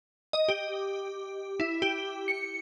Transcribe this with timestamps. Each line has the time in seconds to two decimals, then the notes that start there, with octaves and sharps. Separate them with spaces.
0.33 D#5
0.48 G4
1.60 E4
1.82 G4
2.28 C#7